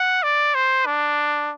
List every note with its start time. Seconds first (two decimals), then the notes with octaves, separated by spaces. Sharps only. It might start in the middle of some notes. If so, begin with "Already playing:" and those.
Already playing: F#5
0.23 D5
0.55 C5
0.86 D4